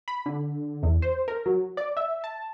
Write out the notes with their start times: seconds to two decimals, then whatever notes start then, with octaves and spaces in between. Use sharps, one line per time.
0.08 B5
0.26 D3
0.83 E2
1.02 C5
1.28 A#4
1.46 F#3
1.77 D5
1.97 E5
2.24 A5